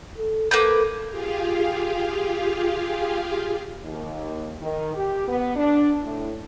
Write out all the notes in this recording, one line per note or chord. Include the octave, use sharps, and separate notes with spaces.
A4
A#3 A4 B4 G6
F4 G4 G#4 F5
D#2
D#3
G4
B3
D4
A2